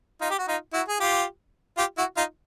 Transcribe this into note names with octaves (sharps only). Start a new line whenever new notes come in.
D#4 F4
G4
F#4
D#4 F4
E4 F#4
G#4
F4 G4
F4 G4
E4 F#4
D#4 F4